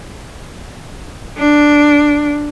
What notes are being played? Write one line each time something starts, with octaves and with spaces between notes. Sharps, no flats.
D4